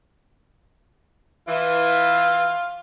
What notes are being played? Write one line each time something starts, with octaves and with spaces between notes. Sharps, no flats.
E3 F4